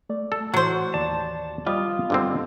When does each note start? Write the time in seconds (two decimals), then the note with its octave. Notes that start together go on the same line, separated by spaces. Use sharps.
0.10 A3 D5
0.32 A4
0.54 A2 E3 F#3 F#4 C5
0.94 D#2 D5 A5
1.67 F3 G3 F4 D#5 F5 D#6
2.10 G2 D3 C4